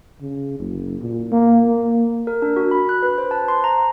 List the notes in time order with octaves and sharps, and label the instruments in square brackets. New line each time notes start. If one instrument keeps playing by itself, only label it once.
[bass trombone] C#3
F#1
A#2
A#3
A#3
[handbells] A#4
D4
F#4
B5
F#6
B4
C5
A5
C6
A#5